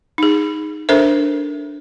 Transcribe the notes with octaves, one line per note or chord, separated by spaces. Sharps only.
D#4 G#4
D4 A4 A#4 C5 E5